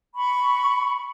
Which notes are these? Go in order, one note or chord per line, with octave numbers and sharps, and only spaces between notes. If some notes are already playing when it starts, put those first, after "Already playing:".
B5 C#6